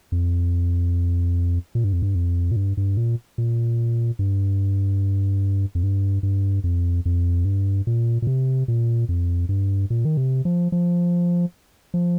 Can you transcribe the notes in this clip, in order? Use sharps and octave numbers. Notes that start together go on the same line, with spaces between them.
F2
A#2
G2
F2
G2
F2
A#2
G2
G2
A#2
A#2
G2
F2
G2
G2
F2
F2
G2
A#2
A#2
C3
A#2
F2
G2
A#2
D#3
C3
F3
F3
F3